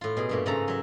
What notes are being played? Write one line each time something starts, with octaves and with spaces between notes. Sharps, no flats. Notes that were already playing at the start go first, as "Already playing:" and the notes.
A2 F4
B2 G#4
G2 A#2 A3
G#2 C#3 A3 C#4 A4 A#5
F#3 E5